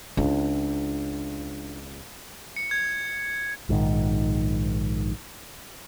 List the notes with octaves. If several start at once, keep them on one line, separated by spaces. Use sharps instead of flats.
C#2 D4
C#7
G#6
A#1 G#2 C3 D#3